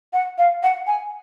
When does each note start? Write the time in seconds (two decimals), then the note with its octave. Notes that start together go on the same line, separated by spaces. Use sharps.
0.13 F#5
0.38 F5
0.63 F#5
0.87 G#5